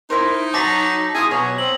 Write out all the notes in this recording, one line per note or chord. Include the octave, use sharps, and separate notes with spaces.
D#4 E4 A#4 C5
F#3 A5 D6 A#6 B6
E4 F4 G#4 D#6
B2 F#3 C#5
C4 F#7